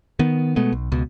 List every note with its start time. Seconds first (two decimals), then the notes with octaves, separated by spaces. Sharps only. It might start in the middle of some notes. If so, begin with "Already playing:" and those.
0.19 D#3 B3
0.56 B2 G#3 A3 B3
0.72 B1
0.92 C#2 B2